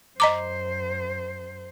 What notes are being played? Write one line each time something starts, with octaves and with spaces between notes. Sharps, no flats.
F#2 C5 D#5 A#5 D6